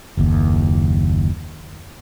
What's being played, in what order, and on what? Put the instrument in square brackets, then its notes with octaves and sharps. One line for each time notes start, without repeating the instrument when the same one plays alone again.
[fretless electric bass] F#1 D#2